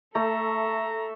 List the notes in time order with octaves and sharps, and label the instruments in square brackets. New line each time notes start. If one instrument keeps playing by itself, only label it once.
[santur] A3 [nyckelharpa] A4 E5 [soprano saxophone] A#5